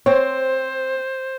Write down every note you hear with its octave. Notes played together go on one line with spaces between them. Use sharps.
C4 C5 C#5